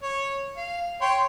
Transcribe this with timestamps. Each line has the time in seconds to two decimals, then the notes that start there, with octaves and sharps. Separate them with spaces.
0.03 C#5
0.57 F5
1.01 C#5 G5 C6